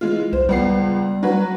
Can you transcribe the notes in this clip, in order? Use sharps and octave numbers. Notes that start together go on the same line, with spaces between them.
E3 G#3 F4
C2 C5
C#2 G3 B3 C7
F#3 F#4 B4